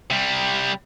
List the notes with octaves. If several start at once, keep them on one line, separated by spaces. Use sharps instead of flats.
C3 G3